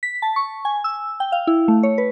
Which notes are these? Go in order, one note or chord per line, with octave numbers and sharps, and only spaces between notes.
B6
A5
C#6
G#5
E6
G5
F5
E4
A3
C#5
B4